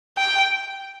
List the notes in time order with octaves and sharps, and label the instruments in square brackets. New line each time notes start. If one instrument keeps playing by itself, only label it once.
[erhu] G5